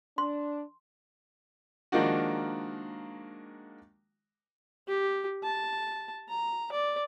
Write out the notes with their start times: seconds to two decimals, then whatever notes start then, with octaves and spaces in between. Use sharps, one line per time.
0.18 D4 C6
1.92 D#3 F3 G#3 A#3 D4 F#4
4.87 G4
5.43 A5
6.29 A#5
6.72 D5